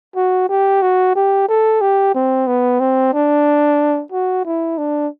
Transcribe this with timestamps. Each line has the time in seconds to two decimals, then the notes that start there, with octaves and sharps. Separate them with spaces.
0.16 F#4
0.49 G4
0.82 F#4
1.16 G4
1.48 A4
1.81 G4
2.14 C4
2.47 B3
2.80 C4
3.14 D4
4.12 F#4
4.45 E4
4.78 D4